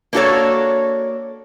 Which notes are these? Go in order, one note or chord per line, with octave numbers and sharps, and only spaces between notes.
A#3 D4 F#4 G4 A4 C#5